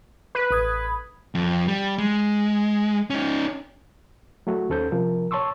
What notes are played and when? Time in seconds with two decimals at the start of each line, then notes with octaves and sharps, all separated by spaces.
0.35 B4
0.51 A1 D#6 G#6
1.35 F2
1.67 G3
1.98 G#3
3.10 C#4 D#4
4.47 F#3 A3 F#4
4.70 D#2 C#4 A4 C5 G6
4.92 C3 F3 A#4
5.31 C#5 A5 C6 C#6 E6